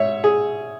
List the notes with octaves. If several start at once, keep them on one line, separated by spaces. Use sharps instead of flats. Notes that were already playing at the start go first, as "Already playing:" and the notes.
Already playing: G#2 C#5 E5
G#4